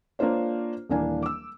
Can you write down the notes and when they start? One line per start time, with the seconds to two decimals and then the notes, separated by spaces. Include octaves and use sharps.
0.19 A#3 D4 F4 C5 C#5
0.89 D#1 E3 A#3 D4 G#5
1.23 D6 E6